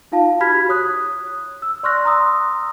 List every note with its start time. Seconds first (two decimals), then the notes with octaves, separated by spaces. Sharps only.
0.12 D#4 F4 F5 A5
0.40 F#4 G4 B5 F6 G#6 B6
0.69 C#5 D#6 F#6
1.62 E6
1.83 D5 C6 C#6 F6 F#6 A#6
2.05 A#5 C6 D#6 E6